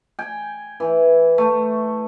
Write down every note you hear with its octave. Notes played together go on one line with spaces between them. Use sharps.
G5 G#5
E3
A3